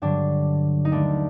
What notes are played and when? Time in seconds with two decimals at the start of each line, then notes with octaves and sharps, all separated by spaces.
0.02 G2 D3 F#3 D4
0.85 D#4
0.92 D#2 D#3 A3 D4